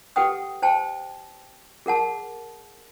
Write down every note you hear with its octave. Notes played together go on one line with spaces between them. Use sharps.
G4 A4 B4 F#5 G5 D#6
C5 G5 A5
G#4 A#4 F#5 A5